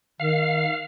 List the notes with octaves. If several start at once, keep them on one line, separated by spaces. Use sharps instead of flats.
D#3 F5